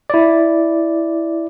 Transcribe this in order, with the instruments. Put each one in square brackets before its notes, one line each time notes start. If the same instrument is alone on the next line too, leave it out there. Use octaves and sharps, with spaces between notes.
[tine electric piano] E4 D5